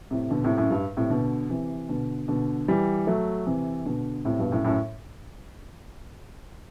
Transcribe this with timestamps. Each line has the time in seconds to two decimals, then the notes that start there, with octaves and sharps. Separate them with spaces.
0.11 A2 C3
0.30 B2 D3
0.44 A2 C3
0.57 F#2 A2
0.70 G2
0.97 A2 C3
1.10 B2 D3
1.50 C3 E3
1.89 B2 D3
2.28 B2 D3
2.68 E3 G3
3.07 F#3 A3
3.46 C3 E3
3.85 B2 D3
4.25 A2 C3
4.39 G2 B2
4.51 F#2 A2
4.64 F#2 A2